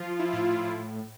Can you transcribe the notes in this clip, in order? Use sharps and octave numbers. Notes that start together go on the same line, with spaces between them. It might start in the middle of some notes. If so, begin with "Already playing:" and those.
Already playing: F3 F4
F3
E4
A2 F4
A2
F4